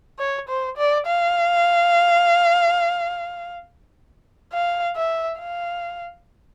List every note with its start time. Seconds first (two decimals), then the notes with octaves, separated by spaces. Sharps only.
0.19 C#5
0.49 C5
0.77 D5
1.07 F5
4.53 F5
4.96 E5
5.39 F5